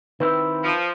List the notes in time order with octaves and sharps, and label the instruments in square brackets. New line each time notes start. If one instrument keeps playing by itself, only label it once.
[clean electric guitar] D#3 C4 E4 [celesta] B4
[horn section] F3